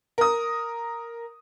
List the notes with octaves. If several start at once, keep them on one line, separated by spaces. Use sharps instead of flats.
A#4 D#6